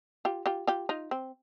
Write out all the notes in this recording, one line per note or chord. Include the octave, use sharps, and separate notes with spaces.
F4 G4
F4 G4
F4 G4
D#4 F4
C4